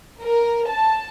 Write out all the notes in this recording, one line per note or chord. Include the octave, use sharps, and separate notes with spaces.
A#4
A5